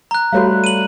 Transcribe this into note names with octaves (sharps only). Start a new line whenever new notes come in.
A#5 F#6
G3 A3 F#4 B4 C#5 F5
D#7 F#7